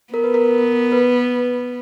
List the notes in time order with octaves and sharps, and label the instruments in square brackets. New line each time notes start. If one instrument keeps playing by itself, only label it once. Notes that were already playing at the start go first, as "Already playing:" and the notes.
[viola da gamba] B3 [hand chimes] A#4
[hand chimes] B4
A#4
B4